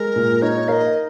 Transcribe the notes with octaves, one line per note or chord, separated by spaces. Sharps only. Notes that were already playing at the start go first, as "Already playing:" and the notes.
Already playing: G#3 A#4
A#2
D#4 C#5
A#4 D#5 F5